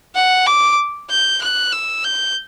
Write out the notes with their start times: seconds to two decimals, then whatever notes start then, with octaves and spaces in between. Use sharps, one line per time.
0.15 F#5
0.46 D6
1.10 G6
1.42 F#6
1.73 E6
2.04 G6